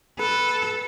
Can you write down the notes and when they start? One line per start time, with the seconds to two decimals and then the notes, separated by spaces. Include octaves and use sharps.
0.19 A4 B4